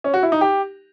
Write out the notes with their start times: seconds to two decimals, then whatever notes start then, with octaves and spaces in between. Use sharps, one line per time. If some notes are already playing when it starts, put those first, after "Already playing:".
0.04 C#4
0.14 F#4
0.23 E4
0.32 D#4
0.41 G4